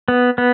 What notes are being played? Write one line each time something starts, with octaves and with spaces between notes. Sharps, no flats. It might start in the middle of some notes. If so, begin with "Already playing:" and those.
B3
B3